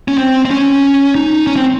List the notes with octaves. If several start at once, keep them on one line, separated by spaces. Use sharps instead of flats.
C#4
C4
C4
C#4
D#4
C#4
C4